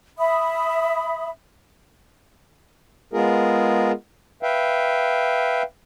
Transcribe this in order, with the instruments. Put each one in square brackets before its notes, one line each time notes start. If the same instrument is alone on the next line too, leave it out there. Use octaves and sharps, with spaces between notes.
[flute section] E5 B5 D#6
[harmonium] G#3 B3 F4 G#4 A#4
B4 E5 F5 G5